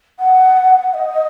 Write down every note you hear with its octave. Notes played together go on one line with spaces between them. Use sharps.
F#5
D#5